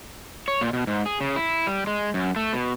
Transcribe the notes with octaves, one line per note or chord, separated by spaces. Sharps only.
C#5
A#2
B2
G#2
G#4
C#3
E4
G3
G#3
F#2
A3
B2